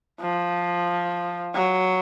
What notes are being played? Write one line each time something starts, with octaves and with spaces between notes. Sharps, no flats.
F3
F#3